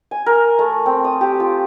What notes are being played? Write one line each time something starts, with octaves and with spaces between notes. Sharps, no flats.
G#5
A#4
A3
C4
D#6
G4
F4